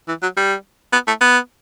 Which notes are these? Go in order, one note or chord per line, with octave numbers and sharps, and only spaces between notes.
E3
F#3
G3
B3
A3
B3